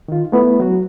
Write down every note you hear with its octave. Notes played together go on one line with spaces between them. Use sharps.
D#3 F4
A3 B3 E4 B4
F#3 F#4